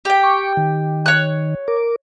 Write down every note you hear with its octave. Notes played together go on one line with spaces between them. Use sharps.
G4 G5
C#6 D6
D#3
C#5 F#6
A#4 D6